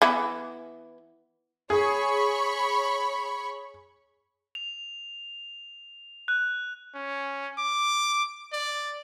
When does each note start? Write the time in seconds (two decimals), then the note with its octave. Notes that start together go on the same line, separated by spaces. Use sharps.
0.02 E3 B3 E4
1.70 G#4 C#5 B5 C#6
4.55 F7
6.28 F#6
6.95 C#4
7.58 D6
8.53 D5